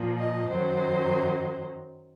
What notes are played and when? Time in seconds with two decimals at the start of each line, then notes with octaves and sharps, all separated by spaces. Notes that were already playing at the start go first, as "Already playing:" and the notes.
Already playing: A#2 F3
0.19 D#5
0.49 F#2 D#3 F#3 C5